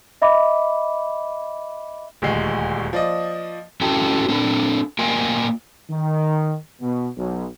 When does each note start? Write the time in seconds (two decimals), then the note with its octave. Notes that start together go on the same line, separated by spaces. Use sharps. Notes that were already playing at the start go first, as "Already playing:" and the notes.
0.22 D#5 E5 B5 D6
2.22 D#1 D2 G#3
2.93 F3 D5 D#5
3.81 C#4 E4 F#4 A4 G5 A5
4.28 C4 D4 A4
4.99 A#3 F4 A#4 D#5 G5 G#5
5.90 D#3
6.81 B2
7.17 B1